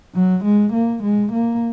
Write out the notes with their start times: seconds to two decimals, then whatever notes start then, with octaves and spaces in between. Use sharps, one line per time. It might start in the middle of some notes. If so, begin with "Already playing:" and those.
0.15 F#3
0.45 G#3
0.73 A#3
1.03 G#3
1.33 A#3